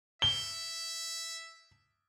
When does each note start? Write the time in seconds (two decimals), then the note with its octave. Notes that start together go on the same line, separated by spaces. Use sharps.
0.22 E5 G7